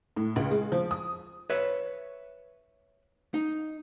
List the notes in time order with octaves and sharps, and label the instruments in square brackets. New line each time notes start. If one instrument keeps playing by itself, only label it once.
[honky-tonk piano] A2
C#2
G#3
F3
D#6
[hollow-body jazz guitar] B4 C#5 E5
D#4